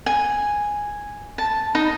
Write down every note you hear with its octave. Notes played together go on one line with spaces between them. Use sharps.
G#5
A5
D#4